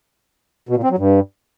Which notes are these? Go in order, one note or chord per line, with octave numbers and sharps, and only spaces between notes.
B2
A#2
C4
F#3
G2